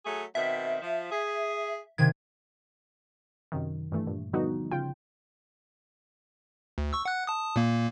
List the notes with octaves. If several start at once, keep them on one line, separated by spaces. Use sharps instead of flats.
F#3 A3 G#4
B2 D#3 C4 E5
F3
G#4
C3 D#3 G#6
F#2 C3 D#3
G2 E3 A3
G2 A#2
D3 F3 G3 B3 D#4 F#4
C#3 F4 G5
D2
C#6 E6
F#5 F#6
A5 D#6
A#2 A#3